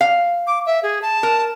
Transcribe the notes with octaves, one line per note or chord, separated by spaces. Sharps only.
F5
D6
E5
G#4
A5
A#4